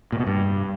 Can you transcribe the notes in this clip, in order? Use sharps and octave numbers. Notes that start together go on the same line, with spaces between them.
A#2
B2
G2